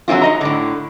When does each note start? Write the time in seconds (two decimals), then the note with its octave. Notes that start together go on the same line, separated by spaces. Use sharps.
0.08 F#3 G#3 C4 E4 F4
0.22 D#4 D#5 A#5
0.41 A2 D3